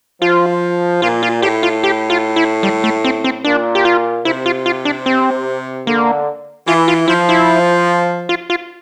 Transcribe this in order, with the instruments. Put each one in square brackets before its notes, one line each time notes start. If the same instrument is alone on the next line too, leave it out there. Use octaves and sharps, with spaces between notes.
[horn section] F3 [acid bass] F4
[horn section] A#2 [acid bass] F4
[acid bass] F4
[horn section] A2 [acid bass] G4
[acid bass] F4
G4
F4
E4
G3
A3
C4
C4
[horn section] A#2 [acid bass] D4
[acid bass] G4
F4
[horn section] C3 [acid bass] E4
[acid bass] F4
F4
D4
C4
[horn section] D3 [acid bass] A#3
[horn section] E3 [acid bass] F4
[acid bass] F4
[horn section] F3 [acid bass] E4
[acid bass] E4
F4
F4